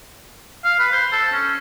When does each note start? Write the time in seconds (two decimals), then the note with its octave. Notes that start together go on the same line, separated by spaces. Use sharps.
0.64 F5
0.79 B4
0.92 C5
1.12 A4
1.32 C#4